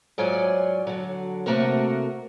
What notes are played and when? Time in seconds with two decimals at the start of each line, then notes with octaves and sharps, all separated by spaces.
0.18 G#2 F#3 F4 D5 G#5
0.87 D3 F#3
1.46 C3 A3 A#3 F#4 A#4